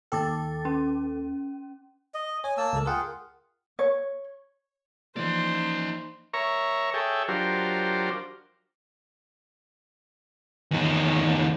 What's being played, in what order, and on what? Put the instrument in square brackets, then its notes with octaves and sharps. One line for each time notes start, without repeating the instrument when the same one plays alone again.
[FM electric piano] D#2 A4 [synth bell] G5 D6 A6
[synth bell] C#4
[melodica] D#5
[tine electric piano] C#5 [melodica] G#5
[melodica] A#3 A5 E6
[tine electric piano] C#2 A4
[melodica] F4 G#4 [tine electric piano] A#4 F#5 G5
[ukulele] C#5
[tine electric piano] E3 F3 A#3 [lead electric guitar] D#4 D5 [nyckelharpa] C5
[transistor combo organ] A#4 C#5 E5 A#5 C#6
G#4 A4 C#5 E5 G5
F#3 D4 F4 G4 A#4 C5
[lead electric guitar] E2 D#3